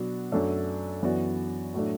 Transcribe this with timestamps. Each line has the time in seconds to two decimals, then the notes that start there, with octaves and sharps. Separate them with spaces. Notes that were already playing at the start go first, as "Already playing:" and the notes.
Already playing: B2 F#3 B3 D4 F#4
0.32 F#2 F#3 A3 D4 A4
1.02 F#2 E3 B3 F#4 D5
1.74 A2 F#3 A3 D4